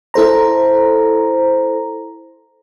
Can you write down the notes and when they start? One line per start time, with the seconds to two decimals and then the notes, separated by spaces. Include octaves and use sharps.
0.14 E4 A4 C5 A#5